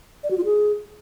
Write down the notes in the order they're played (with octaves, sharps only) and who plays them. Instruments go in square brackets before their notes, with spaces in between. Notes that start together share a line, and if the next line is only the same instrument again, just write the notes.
[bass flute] D5
F#4
F4
G#4